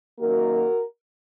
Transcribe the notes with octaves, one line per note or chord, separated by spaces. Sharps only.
F#2 D#3 A#3 F#4 A#4